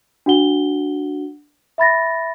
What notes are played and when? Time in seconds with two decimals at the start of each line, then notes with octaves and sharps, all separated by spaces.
0.26 D4 F#4 F#5 G7
1.78 E5 B5 A6 A#6